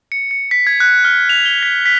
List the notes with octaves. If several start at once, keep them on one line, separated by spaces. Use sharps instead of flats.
C#7
C#7
B6
G#6
F#6
F6
F7
G7
B6
B6